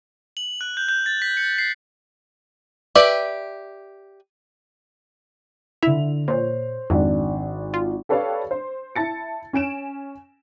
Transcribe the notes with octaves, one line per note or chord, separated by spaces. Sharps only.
F#7
F#6
G6
G6
A6
B6
C#7
C7
G4 B4 D5 E5 G5
D3 E4 E5 F7
A#2 C5 C#5
G#1 F2 G#2 D4
F4
G4 A4 B4 C#5 D5 F5
C5
E4 A5 A6 C#7
C#4 G#5 D7 E7